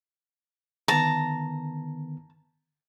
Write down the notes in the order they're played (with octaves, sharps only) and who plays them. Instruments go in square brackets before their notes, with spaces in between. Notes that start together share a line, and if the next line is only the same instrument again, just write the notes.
[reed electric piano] D3 D#3 B3 [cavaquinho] A5 A#5